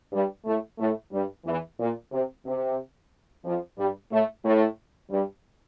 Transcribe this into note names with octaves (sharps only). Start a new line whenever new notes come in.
G2 G3
A2 A3
A2 A3
G2 G3
E2 E3
A#2
C3
C3
F2 F3
G2 G3
A2 A3
A2 A3
G2 G3